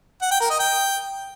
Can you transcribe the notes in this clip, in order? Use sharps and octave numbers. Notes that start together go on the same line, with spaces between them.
F#5
G5
A#4
D#5
G5